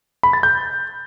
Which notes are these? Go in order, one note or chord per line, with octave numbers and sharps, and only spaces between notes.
B5
A6
G6